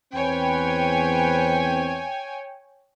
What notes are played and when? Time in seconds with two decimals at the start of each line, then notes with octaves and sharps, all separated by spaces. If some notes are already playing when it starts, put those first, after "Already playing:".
0.14 E2 C4 B4 C#5 G5 G#5